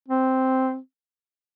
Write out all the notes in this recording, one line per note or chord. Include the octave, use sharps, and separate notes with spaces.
C4